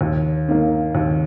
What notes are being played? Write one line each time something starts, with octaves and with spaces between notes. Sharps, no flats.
D#2
D#3 A#3
D#2